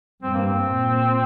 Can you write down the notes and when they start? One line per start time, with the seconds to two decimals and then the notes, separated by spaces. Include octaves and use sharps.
0.22 G2 C4
0.34 A#3
0.46 C4
0.70 A#2